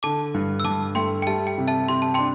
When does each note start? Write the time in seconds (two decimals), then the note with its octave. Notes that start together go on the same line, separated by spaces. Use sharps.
0.03 D3 A5 D6
0.34 G2
0.60 E6
0.64 G2 A5 D6
0.95 A3 G5 C6
1.22 G5
1.27 G3 E5 A5
1.47 G5
1.58 C3
1.68 E5 A5
1.88 C3 C6
2.02 A5
2.14 D4 G5 C6